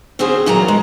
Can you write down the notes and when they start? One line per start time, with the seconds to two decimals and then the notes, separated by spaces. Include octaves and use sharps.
0.19 D3 C4 C#4 F#4 G#4 C5
0.46 E2 A#2 F#3 A#4 A#5
0.68 G#3